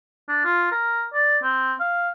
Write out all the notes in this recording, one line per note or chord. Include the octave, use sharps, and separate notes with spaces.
D4
F4
A#4
D5
C4
F5